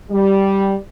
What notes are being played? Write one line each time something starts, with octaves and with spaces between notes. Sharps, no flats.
G3